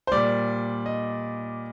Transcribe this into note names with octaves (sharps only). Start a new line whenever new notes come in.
C5
A#2 G3 D5
D#5